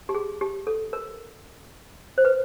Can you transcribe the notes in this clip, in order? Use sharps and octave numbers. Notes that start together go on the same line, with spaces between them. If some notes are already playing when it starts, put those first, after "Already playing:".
G4
G#4
G4
A4
A#4
C5
B4